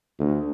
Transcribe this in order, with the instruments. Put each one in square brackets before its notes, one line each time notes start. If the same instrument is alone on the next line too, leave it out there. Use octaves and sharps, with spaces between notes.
[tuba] D2